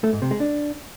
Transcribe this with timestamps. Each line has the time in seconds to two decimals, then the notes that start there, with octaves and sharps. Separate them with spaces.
0.04 A3
0.13 G#2
0.22 C3
0.31 G#3
0.40 D4